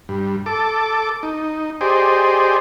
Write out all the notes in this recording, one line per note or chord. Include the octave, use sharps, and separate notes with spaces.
G2
A4 D6
D#4
G4 G#4 C5 D5 D#5